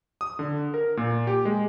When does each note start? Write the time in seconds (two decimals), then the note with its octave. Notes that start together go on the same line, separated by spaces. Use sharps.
0.21 D#6
0.39 D3
0.74 A#4
0.97 A#2
1.27 G4
1.45 G#3